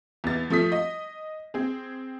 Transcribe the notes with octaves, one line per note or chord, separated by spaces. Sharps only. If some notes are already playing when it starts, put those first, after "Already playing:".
E2 A6
F3 A3 D#6 B6
D#5
C4 G#4